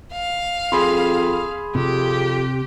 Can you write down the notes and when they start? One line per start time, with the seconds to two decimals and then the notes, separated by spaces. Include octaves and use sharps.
0.13 F5
0.72 F2 G#4 B5 C6
1.75 F2 C3 G4